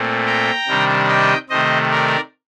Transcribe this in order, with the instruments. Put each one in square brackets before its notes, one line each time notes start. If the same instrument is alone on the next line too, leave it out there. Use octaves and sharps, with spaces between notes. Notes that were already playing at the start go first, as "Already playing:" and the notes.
Already playing: [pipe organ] A#2 A3 C4
G5 A#5
C3 D#3 G3 D4
D#5 G5
C3 D#3 A3 C5 D#5
A#4 D5